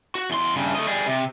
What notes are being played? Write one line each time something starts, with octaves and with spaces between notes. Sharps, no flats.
F#4
E2 C6
G2 C#3
A3 D#5
G3 G#4
C3